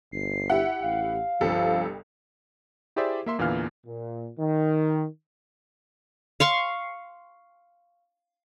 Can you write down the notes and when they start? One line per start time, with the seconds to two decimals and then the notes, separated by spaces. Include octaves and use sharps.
0.12 G1 C7
0.50 E4 G4 E5 F#5
0.82 A1 F5
1.41 G1 C2 F3 A4
2.96 E4 G4 G#4 C5 D5 E5
3.26 A#3 E5 C6
3.39 E2 A#2 D3 E3 F5 F6
3.86 A#2
4.38 D#3
6.40 F5 C6 C#6